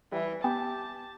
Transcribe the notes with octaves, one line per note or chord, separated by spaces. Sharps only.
E3 G3 E4
B3 G4 G5 A5